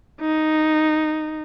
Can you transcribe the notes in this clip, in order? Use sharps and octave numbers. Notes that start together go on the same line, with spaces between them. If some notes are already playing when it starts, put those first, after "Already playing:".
D#4